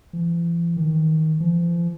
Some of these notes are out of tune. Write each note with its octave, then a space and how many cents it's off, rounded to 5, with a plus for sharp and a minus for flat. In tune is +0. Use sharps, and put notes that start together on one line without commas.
E3 +45
D#3 +20
F3 -35